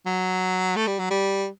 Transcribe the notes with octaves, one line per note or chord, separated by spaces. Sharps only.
F#3
A3
G3
F#3
G3